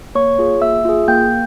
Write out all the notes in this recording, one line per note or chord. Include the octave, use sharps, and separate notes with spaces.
A#3 C#5 C#6
F4 G#4
A#3 E5 E6
F4 G#4
A#3 G5 G6